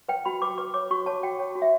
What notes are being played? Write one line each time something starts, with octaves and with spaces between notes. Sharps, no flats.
B4 G5
F#4 B5
B4 D6
B4 D6
C#5 D6
F#4 C#6
C#5 A5
F#4 G5
C#5
F#4
E5